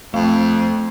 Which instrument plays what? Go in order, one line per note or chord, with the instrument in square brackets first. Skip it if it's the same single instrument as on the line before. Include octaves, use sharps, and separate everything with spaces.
[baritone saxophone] F2 [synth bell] A3